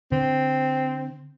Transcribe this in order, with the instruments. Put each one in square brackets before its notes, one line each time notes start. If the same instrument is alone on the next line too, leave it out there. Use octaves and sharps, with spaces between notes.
[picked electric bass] D3 [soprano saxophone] C4